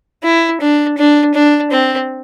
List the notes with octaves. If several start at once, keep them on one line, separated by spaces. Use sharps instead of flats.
E4
D4
D4
D4
C4